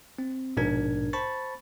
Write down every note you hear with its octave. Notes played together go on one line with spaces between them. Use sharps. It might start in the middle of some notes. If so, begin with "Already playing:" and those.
C4
A#1 G#2 B2 D4 A#4 G#6
C5 A5 B5 C#6 A6